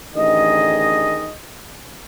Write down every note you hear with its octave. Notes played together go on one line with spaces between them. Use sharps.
A1 D3 D#3 G#4 D#5